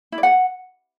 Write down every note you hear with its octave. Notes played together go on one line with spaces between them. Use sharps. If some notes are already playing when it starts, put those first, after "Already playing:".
E4
D5
F#5